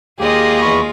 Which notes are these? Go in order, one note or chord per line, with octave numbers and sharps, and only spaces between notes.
D#2 G#3 A#3 F4 G4 G#4 D#5
E2 B5 C#6